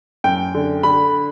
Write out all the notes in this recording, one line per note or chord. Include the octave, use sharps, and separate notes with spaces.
F#2 G5
D3
D3 B5